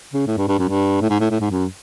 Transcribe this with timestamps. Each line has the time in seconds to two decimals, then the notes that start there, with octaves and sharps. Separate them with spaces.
0.14 C#3
0.27 A2
0.38 G2
0.48 G2
0.59 F#2
0.69 G2
1.01 A2
1.10 G#2
1.20 A2
1.31 A2
1.41 G#2
1.51 F#2